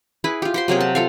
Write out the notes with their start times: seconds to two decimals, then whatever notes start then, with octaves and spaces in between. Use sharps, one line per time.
0.24 E4 G#4 B4
0.42 F4 G4
0.54 G4 C5 C6
0.68 C3 F#3 A#3 G#4
0.80 A5
0.95 F4 A4 F5